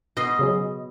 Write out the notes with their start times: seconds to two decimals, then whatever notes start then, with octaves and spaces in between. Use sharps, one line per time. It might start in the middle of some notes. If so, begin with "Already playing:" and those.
0.17 B2 D#5 C6
0.39 C#3 F#3 G#4